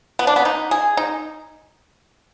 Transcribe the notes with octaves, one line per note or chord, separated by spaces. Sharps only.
B3
D4
B3
D#4
G#4
D#4